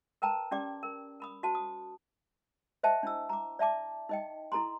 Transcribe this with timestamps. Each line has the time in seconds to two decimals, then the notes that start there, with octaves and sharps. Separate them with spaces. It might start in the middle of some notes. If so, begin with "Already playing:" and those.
0.22 A#4 B4 G5 A5 A#5
0.51 C#4 G4 D5 D6
0.83 A#4
1.20 A#4 B5 D#6
1.43 F#4 C5 A5
1.55 D#6
2.83 C5 D#5 E5 G5 A5
3.03 D4 E4 E6
3.29 A#5 D6
3.59 D5 E5 A5 D6
4.09 D#4 D#5 G5
4.52 E4 A4 A#5 C6